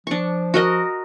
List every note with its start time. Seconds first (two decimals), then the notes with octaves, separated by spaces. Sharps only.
0.07 F3 D4 C#6
0.54 F#4 A#4 D#5